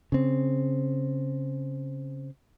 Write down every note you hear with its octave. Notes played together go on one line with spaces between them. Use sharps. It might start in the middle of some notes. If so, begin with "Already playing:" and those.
C#3 C4